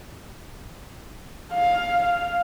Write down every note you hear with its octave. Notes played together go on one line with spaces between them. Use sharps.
F5
F5